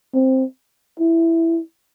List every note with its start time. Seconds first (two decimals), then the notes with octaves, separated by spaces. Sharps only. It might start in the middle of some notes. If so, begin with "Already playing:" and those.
0.14 C4
1.00 E4